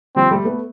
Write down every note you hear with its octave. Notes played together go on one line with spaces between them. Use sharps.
F3 G3 C4
G3 A3
A3 B3